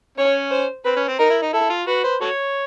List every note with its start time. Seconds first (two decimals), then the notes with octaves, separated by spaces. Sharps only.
0.18 C#4 C#5
0.51 C5
0.85 C4 B4
0.96 C#4
1.08 C4
1.19 D#4 A#4
1.30 E4
1.42 D#4
1.53 E4 A4
1.70 F4
1.87 F#4 B4
2.04 C5
2.21 F#4 A4 C#5